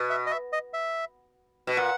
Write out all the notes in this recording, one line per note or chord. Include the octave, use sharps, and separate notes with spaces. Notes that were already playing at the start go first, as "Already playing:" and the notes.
Already playing: B2
E5
D#5
E5
D#5
E5
B2
A#2 F#5